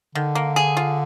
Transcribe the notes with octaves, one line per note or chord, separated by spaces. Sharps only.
D3 D#3
A#3
G#4
F4